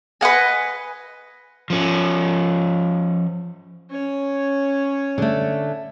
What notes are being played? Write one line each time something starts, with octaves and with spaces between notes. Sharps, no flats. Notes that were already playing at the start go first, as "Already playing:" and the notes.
B4 D#5 F#5 G#5
F3 C#4
C#4 C#5
D3 A3